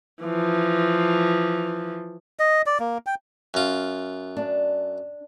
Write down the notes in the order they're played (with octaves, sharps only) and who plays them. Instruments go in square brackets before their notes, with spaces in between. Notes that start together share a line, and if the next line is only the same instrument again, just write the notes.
[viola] E3 F3
[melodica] D#5
D5
A#3
G5
[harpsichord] F#2 F4
[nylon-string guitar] D4